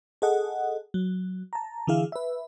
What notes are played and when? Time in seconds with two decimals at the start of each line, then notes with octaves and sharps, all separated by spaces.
0.22 G#4 A4 D#5 F#5
0.94 F#3
1.53 A5 A#5
1.87 D3 E3 E4 G#4 F5
2.12 B4 E5